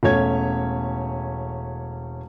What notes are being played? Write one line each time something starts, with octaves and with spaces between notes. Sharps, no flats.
E1 A3 C#4 C#5 G#6